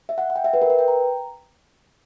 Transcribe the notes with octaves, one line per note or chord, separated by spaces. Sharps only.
E5
F#5
F#5
G5
E5
B4
A#4
B4
G5
A#5